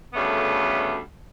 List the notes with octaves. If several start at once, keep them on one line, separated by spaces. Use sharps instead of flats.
D2 C#3 G3 A3 B3